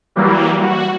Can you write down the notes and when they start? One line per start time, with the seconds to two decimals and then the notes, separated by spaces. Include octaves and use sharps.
0.16 E3 F#3 G3 A#3
0.62 F#4